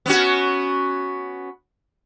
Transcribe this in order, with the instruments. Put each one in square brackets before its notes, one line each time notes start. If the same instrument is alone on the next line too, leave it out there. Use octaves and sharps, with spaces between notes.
[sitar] B3 C#4 F#4